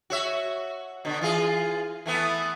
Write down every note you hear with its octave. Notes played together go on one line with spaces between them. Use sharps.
F#4 C#5 E5
B2 D3
E3 F4 G#4
E3 A3 B3